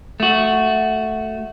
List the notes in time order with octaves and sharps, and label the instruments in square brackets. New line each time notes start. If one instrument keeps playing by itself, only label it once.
[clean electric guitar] A3 F#4